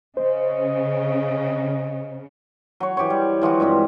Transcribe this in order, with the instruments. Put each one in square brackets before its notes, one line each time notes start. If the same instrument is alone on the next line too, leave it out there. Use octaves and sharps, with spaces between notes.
[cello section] C#3 [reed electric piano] C5 [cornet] D#5
[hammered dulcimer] F#3 C#5
E3 G4 C5 C#5
G3
E3 F3 G#3 F#4
G2 G#3 C4 G4